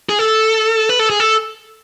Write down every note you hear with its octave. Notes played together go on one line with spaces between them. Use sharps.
G#4
A4
B4
A4
G#4
A4